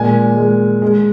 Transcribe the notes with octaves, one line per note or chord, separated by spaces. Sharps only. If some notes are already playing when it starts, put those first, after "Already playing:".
Already playing: A#2 G#3 G#5
G#3
G#3